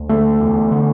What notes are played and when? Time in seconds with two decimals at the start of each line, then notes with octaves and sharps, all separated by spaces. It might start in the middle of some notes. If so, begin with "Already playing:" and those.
Already playing: D2
0.09 D3 A3
0.40 E2
0.71 D3